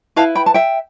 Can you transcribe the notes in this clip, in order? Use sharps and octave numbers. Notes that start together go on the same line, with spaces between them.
E4 B4 F5 A5
G5 B5
A5
E5 G5